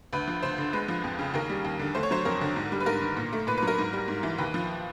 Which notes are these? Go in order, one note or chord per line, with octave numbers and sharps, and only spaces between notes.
D2 B4
F3
D2 C5
D3
G#3 B4
F3
F2
C#3
D#2 A#4
G3
D#2
D3
A3 C5
C#5
F#3 C5
F2 A#4
D3
G#2
G3
B4
G#2 A#4
D#3
A#2
A3
A#2 B4
F#3 B4
A#4
G#2
G3
G#2
E3
D#2 B4
F3